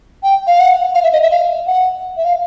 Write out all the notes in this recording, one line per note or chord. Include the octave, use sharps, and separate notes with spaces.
G5
F5
F#5
F5
E5
D#5
E5
F5
F#5
E5
F5